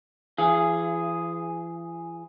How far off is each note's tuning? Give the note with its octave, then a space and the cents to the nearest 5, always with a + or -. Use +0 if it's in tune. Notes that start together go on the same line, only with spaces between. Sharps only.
E3 +40 G#4 +0 F5 -40